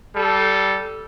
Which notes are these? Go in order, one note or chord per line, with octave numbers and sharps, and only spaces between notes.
G3 A4